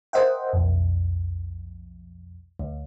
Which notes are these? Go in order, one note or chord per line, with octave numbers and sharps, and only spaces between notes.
A#4 C5 D#5 E5 F#5 G5
B1 F2
D2